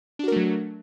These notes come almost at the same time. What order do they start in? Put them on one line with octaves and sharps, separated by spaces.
D4 F#4 A#4 A3 F#3